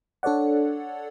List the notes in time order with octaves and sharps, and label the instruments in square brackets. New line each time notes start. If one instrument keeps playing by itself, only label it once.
[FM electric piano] D4 A4 C#5 D5 F#5